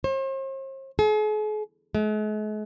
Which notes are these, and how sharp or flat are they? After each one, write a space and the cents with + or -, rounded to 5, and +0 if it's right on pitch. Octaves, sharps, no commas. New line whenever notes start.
C5 +45
G#4 +45
G#3 +45